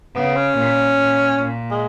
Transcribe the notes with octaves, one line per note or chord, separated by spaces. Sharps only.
C#3 B3
C#4
A#2
A#2
A#2
G#3